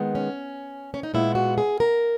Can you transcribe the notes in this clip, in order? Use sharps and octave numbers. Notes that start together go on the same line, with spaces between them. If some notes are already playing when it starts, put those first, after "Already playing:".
Already playing: D#3 G#3 B3
C#4
C#4
D#4
A#2 G#3 B3 E4
F#4
G#4
A#4